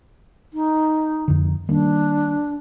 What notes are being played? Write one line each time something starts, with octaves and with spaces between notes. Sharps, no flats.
D#4
F2 D3
D#3 G3 A#3 D4